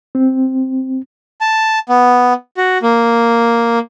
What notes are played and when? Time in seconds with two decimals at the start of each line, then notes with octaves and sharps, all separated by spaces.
0.15 C4
1.41 A5
1.89 B3
2.57 F#4
2.83 A#3